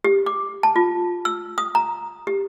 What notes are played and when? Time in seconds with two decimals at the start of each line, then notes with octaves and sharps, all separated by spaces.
0.04 G4
0.26 D6
0.63 A5
0.76 F4
1.25 E6
1.58 D#6
1.75 A#5
2.27 G4